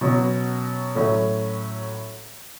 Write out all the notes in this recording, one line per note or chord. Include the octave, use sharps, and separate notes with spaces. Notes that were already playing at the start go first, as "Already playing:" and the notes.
B2 F#3 C#4
A2 F#3 A3 C#4